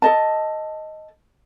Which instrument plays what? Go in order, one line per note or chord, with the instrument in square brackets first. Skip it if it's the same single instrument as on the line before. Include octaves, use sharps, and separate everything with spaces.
[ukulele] A4 D#5 A5